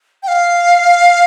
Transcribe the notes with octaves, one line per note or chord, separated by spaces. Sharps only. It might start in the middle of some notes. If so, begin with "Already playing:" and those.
G5
F5